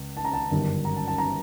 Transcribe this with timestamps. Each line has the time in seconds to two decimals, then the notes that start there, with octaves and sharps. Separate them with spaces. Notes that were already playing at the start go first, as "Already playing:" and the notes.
Already playing: C#2
0.17 A5
0.25 A#5
0.34 A5
0.51 G1 F#2 D#3 G3
0.85 A#5
0.97 A5
1.08 A5
1.18 A#5